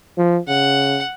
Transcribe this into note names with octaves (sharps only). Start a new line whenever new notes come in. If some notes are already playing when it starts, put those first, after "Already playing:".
F3
C#3 F#5